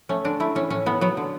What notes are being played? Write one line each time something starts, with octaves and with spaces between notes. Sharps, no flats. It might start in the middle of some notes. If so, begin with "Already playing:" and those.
A3 C#4
D3 D4
A3 E4
E3 C#4
A2 C#4
A2 B3
F#3 B3
D3